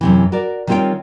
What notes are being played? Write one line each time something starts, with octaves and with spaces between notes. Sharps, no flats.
F#2 C3 E3
F#4 A#4 D5
D#3 G3 C4 F4 C#5 G5